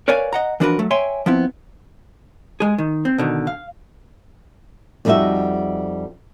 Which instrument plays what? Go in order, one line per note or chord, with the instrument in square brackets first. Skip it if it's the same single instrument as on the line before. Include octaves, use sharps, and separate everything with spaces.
[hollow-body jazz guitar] A#4 B4 C#5 D5 F5 G#5
D#5 F#5 A#5
E3 F3 D4 F#4 A#4 B4
F#3 A3
C#5 E5 G5 G#5 C6
F3 B3 C4 E4
G#3 G#4
D#3
C4
B2 D3 D#3
F5
[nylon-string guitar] F2 G3 G#3 D#4 F#4 E5